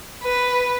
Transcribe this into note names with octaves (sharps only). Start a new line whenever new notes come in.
B4